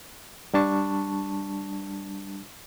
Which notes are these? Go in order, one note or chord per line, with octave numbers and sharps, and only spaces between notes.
G3 D4 A5 C#6